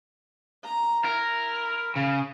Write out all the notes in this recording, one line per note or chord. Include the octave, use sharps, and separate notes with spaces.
A#5
E4 A#4
C#3